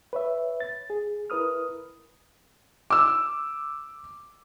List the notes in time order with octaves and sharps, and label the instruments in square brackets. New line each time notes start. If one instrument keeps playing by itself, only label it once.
[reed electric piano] B4 C#5 E5
A6
G#4
E4 A#4 B4 D#6 F6
[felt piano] D6 E6